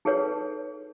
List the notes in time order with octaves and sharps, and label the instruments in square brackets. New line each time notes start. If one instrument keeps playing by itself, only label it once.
[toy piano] D#4 G#4 A4 B4 C#5